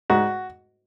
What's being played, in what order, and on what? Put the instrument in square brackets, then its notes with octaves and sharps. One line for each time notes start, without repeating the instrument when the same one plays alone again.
[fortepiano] G#2 F#4